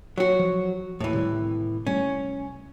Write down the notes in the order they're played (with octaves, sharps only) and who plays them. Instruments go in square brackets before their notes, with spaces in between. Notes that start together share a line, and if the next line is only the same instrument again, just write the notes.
[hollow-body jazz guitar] F#3 F#4
[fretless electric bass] F3
[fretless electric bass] D#2 [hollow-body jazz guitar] A2 E3
[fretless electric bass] C3 D#3 G3
[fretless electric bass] C3 G3 A3 [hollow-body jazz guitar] C#4